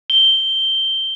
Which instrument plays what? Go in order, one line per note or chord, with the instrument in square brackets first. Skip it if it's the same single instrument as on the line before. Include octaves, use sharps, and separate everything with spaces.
[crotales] G7